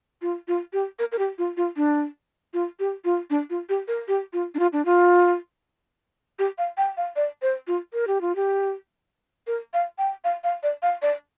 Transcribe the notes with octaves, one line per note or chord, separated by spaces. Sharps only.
F4
F4
G4
A#4
A#4
G4
F4
F4
D4
F4
G4
F4
D4
F4
G4
A#4
G4
F4
D4
F4
D4
F4
G4
F5
G5
F5
D5
C5
F4
A#4
G4
F4
G4
A#4
F5
G5
F5
F5
D5
F5
D5